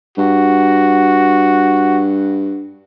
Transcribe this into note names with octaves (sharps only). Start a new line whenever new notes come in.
G2 F#4